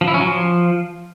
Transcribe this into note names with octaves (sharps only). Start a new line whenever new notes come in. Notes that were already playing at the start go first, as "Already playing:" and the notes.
F3
E4
C#4
F#3
F3